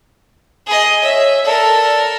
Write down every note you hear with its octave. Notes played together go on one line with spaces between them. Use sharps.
G#4 D#5
C#5 E5
A4 A#4 D5